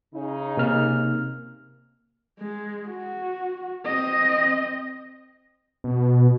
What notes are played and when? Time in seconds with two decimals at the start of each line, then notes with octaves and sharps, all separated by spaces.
0.14 C#3 D#4
0.57 C3 A#3 F6
2.39 G#3
2.87 F#4
3.85 C4 D#5
5.84 B2